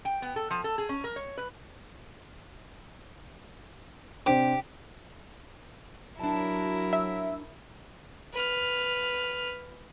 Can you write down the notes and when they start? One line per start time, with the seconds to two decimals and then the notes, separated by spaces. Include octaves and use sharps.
0.05 G5
0.22 B3
0.36 A4
0.51 F3
0.64 A4
0.78 G#4
0.89 C#4
1.04 A#4
1.16 C#5
1.37 B4
4.26 C3 D4 G4 C5
6.20 F#3 D4 E4 A#4 A5
6.93 E5
8.33 B4 F6